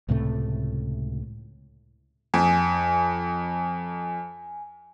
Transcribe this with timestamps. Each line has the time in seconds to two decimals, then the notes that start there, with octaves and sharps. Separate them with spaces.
0.09 C#2 A2 C3 A3
2.34 F2 G#5